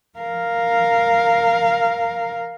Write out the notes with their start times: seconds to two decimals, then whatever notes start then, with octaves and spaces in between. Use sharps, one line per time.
0.19 A#4 F5